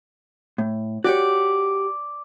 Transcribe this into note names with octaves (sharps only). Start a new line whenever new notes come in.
A2
F#4 G4 C#5 D5